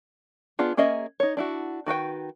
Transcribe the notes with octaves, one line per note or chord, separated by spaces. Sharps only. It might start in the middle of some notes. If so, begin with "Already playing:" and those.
B3 D4 F4 G#4
A#3 C#4 G#4 D#5 E5
D#4 C#5
D4 E4 F#4
D#3 F#4 B4 G5